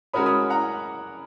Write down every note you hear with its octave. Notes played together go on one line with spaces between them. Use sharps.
G#3 C#4 F#4 A#4 C#5 B5 D#6
B5 D#6
F#5 A#5